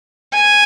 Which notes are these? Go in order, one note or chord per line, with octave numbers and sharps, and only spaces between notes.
G#5